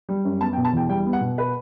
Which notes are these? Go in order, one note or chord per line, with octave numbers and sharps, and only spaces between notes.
G3
F#2
B3 A5
G5
B2
A5
E2 G5
G3 G5
B3
F#5
B2
B4